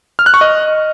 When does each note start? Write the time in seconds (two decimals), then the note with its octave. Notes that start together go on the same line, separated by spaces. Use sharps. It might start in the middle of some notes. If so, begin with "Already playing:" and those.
0.19 F6
0.26 F#6
0.34 C#6
0.41 D#5